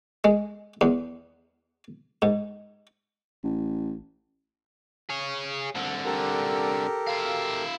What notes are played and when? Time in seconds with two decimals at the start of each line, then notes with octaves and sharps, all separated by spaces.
0.24 G#3
0.81 E2
2.22 G#2
3.44 A1
5.09 G#4 C#5
5.75 C2 D3
6.05 G4 A4 A#4
7.07 E4 F5